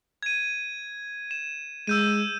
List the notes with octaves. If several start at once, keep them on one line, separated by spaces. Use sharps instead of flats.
G#6 D#7
E7
G#3 E6 G6 D#7